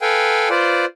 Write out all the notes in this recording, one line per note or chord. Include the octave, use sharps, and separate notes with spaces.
A4 B4 F5 G5 G#5
F4 B4 C5 D5